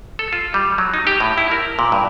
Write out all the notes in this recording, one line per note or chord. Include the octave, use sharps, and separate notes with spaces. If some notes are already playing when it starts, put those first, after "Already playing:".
A4
F4
G3
F#3
D#4
G4
A2
E4
A#4
A#2
G2